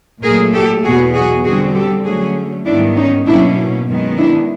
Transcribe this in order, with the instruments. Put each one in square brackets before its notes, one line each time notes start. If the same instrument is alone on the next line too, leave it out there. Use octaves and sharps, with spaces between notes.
[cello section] A#2 F#3 A3 G#4 A#4
G4 A4
E2 B2 F#3 B3 F#4 G#4
F#4 G#4
D3 G3 C4 F#4 G#4
G4 A4
D3 F#3 A3 C#4 F#4 G#4
G#2 D#3 G3 B3 D4 E4
C#4 D#4
B2 F#3 A#3 C#4 D4 E4
F#2 D#3 G#3 B3
D4 E4